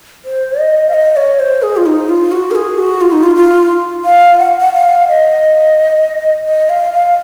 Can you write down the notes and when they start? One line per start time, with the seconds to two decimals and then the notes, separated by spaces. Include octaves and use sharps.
0.25 C5
0.59 D#5
0.89 F5
0.94 D#5
1.16 C#5
1.39 C5
1.62 G#4
1.77 F4
1.86 D#4
2.09 F4
2.32 F#4
2.51 A#4
2.55 G#4
2.78 F#4
3.01 F4
3.12 D#4
3.23 F4
3.36 F4
4.05 F5
4.39 F#5
4.60 F#5
4.73 F5
5.08 D#5
6.47 D#5
6.69 F5
6.93 F5